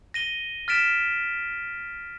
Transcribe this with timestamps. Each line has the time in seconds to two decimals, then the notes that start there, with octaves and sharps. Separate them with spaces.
0.14 A#6 D#7 G7
0.68 F6 A6 B6 D7 E7